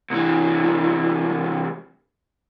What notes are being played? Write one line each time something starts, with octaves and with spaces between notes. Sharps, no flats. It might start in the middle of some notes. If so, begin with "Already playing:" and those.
C2 E3